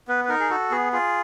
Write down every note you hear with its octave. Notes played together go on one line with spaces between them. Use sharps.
B3 B4
B4
D#4 A#4
G#4
F#4 A4
B3 G#4
F4 G#4